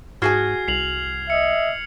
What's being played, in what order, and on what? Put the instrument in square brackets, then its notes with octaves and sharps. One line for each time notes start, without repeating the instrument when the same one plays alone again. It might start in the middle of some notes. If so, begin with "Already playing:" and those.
[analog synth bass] G#2 [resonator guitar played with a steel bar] F#4 G#4 G#5 [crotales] F6 G#6 C7
[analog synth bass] C2 [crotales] C7 F7 F#7
[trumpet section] D#5 E5 [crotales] C#7